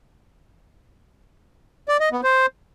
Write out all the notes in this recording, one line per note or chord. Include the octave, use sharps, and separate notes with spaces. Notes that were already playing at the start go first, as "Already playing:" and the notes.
D5
D#5
B3
C5